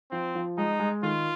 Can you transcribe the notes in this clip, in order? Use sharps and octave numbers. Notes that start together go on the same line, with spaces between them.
F3 C4
F3
G#3 D#4
G#3
D#3 F4